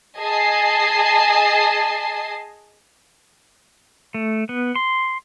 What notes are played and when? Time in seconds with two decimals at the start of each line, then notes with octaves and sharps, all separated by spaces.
0.17 G#4 D#5 G#5 A5 C7
4.14 A3
4.49 B3
4.75 C6